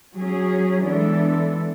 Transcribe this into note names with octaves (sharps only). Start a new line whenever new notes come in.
F#3 C#4 G#4
E3 G#3 B3 D4 A4